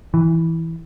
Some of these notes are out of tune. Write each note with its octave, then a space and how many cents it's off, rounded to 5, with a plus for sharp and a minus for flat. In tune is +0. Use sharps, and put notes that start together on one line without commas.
E3 -10